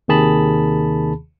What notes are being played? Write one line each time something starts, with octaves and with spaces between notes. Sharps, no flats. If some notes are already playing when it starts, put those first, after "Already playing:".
D#2 C3 D#3 G#4 A5 B5